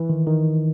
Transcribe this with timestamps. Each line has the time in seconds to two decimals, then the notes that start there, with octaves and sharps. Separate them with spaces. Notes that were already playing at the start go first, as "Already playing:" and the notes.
Already playing: E3
0.10 D#3
0.27 D#3